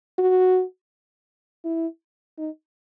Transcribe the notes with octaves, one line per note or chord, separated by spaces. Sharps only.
F#4
E4
D#4